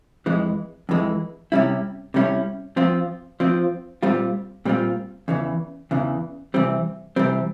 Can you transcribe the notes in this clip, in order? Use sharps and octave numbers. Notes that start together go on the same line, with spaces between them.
F2 E3 G#3
F2 E3 G#3
C3 G3 C#4 E4
C3 G3 C#4 E4
F3 C4 F4
F3 C4 F4
A#2 G3 C4 F4
A#2 G3 C4 F4
E2 C#3 E3
E2 C#3 E3
C3 E3 G3 C4
C3 E3 G3 C4